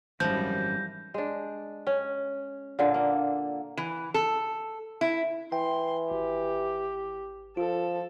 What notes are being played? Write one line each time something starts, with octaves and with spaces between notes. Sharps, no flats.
G#1 F#2 E3 F3 G3 G6 A#6
G#3 D4
C#4
A#2 D3
A#3
E3
A4
E4
E3 G5 C6
G#1 G4
F3 F4 A4